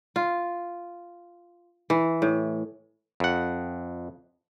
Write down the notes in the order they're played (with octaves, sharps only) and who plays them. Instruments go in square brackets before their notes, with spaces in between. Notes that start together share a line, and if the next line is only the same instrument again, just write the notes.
[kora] F4
E3
A2
[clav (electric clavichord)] F2 F#5